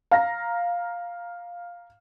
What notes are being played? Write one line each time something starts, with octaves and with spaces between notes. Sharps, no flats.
F5 A#5 A#6